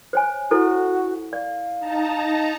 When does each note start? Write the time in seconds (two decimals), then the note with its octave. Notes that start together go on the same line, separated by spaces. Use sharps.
0.13 C5 C#5 G#5
0.51 E4 F#4 A4 C5
1.33 D5 F5
1.80 D#4 A5 A#5